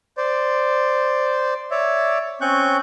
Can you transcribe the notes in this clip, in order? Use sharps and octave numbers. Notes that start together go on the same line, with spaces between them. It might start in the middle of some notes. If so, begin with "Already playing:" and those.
C5 D5
C#5 D5 E5
C4 C#4 C#6 F#6 G6